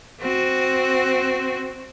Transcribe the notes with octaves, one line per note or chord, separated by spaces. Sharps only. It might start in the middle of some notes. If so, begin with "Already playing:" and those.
C4 F#4